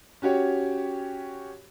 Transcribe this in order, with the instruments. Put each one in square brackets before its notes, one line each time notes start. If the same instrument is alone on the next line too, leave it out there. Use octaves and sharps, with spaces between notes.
[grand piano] C#4 F#4 G4 C#5